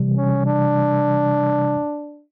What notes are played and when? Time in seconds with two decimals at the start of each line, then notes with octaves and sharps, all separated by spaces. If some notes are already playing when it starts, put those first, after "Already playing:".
Already playing: C3 E3 G3
0.17 C#4
0.46 D4